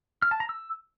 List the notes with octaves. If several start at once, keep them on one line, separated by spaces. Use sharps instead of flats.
F6
A5
A#5
E6